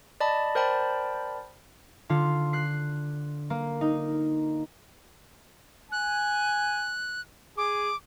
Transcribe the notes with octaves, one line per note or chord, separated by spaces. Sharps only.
D5 D#5 A5 B5
A#4 C5 D5 G5 A5 B5
D3 F4
F#6 C7
A#3
D#4
G#5 F#6
G#4 D6